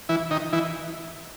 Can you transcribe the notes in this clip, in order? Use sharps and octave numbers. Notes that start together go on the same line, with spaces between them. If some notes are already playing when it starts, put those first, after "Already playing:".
E3 E4
D#3 D#4
E3 E4